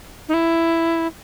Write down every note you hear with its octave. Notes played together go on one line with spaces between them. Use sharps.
D#4
E4